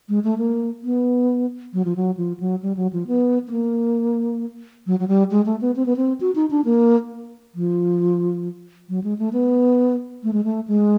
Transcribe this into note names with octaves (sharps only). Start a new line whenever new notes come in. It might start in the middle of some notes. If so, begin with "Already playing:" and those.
G#3
A3
A#3
B3
F#3
F3
F#3
F3
F#3
G3
F#3
F3
B3
B3
A#3
F#3
F#3
G3
G#3
A3
B3
C4
B3
C4
F#4
D#4
D4
A#3
F3
F#3
G#3
A3
B3
A3
G#3
A3
G#3